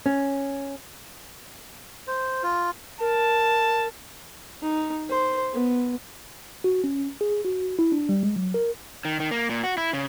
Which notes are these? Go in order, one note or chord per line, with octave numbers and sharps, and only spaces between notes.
C#4
C5
F4
A#4 A5
D#4
C5
B3
F#4
C#4
G#4
F#4
E4
D4
G3
G#3
F#3
A#4
D#3
D#3
A#3
A#2
F#4
E4
C#3